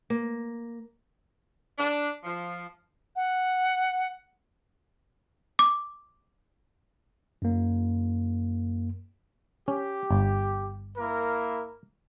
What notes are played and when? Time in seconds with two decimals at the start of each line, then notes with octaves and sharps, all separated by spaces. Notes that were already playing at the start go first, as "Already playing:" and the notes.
0.10 A#3
1.78 D4
2.23 F3
3.16 F#5
5.59 D6
7.42 F#2 A#3
9.68 C#4 G4
10.11 G1
10.97 A#3 E4 A#4